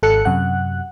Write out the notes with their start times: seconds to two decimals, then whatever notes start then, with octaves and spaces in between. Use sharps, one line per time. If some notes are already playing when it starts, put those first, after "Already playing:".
0.03 G#1 A4 F#6 C#7
0.25 F#2 C3 F#5 F#6